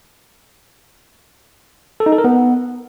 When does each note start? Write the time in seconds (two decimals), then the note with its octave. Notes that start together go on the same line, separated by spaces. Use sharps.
2.00 A4
2.06 D#4
2.12 A4
2.18 A#4
2.24 B3